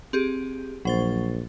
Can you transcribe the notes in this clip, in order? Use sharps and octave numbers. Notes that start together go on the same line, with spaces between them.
C4 G4 G#4
A#1 F#3 C5 A6